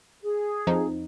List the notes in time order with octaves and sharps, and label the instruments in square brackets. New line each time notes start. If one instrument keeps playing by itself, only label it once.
[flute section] G#4
[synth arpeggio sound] F2 F3 D#4